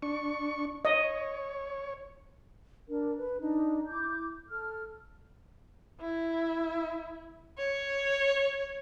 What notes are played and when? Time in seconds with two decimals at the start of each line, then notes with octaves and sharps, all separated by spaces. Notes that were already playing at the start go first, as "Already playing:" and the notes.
0.02 D4 C#6
0.85 C#5 D#5
2.88 D4 A#4
3.17 B4
3.40 D4 D#4
3.87 E4 D6 G6
4.48 A4 F6
6.00 E4
7.58 C#5